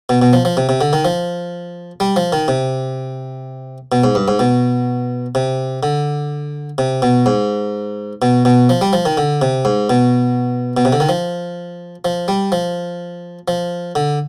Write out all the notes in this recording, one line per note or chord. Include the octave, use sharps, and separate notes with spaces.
B2
B2
F3
F3
C3
C3
D3
D#3
F3
G3
F3
D#3
C3
B2
G#2
G2
G#2
B2
C3
D3
C3
B2
G#2
B2
B2
F3
G3
F3
D#3
D3
C3
G#2
B2
B2
C3
D3
D#3
F3
F3
G3
F3
F3
D3